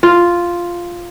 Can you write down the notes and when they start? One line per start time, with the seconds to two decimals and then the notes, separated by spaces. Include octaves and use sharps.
0.03 F4